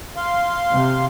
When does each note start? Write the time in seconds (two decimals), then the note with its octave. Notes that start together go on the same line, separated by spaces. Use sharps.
0.16 F5 C6
0.71 C3